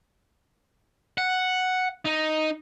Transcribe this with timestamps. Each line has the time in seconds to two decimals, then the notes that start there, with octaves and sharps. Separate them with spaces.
1.18 F#5
2.05 D#4